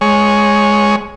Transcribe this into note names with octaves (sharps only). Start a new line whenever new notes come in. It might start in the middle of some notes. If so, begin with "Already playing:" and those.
G#3 C#5